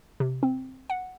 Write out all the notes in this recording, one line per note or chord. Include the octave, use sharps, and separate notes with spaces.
C3
C4
F#5